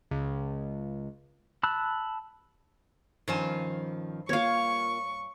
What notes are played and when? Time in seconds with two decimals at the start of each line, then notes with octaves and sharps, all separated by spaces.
0.11 C#2
1.63 A5 B5 E6 F#6
3.28 G2 D#3 F3 C#4 C5 G#5
4.29 A#3 F4 C#5 F5 C#6